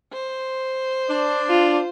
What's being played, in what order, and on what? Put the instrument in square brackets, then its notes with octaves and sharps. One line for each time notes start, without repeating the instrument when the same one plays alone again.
[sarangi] C5
[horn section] D4 D5
[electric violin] F4